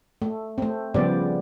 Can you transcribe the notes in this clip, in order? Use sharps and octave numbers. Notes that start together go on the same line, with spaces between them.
A3
A3 C4
C#3 F3 G3 B3 C4 D5